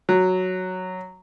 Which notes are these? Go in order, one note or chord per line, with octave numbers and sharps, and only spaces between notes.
F#3